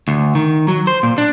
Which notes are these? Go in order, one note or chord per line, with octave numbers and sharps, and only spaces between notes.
D2
D#3
F#3
C5
A#2
D4